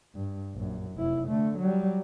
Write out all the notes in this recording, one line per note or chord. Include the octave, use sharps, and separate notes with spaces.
G2
A#1 F#2
F1 E4
D3 A3
F#3 G3